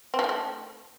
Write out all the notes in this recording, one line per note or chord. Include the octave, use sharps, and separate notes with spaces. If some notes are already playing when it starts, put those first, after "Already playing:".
C4
F3
D#3
A3